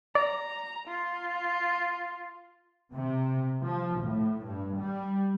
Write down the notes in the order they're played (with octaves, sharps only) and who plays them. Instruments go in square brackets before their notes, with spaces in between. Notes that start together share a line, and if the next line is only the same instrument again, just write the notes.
[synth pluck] D5 [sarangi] A#5
[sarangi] F4
[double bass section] C3
F3
A2
G2
G3